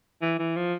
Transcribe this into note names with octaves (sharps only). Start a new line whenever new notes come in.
E3
E3
F3